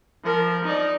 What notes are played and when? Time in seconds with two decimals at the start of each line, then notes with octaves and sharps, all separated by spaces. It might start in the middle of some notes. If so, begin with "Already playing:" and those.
0.24 F3 A#4
0.64 D#4 D5